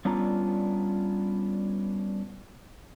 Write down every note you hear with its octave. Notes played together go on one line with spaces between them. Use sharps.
G3 B3 C#4 D4 F4 A#5